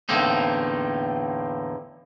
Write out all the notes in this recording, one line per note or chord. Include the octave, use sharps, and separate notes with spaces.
E2 A2 D3 A#3 C4 D#4